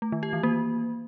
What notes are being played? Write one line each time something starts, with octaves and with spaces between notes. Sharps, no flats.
A3
D#3
G4
E3
A#3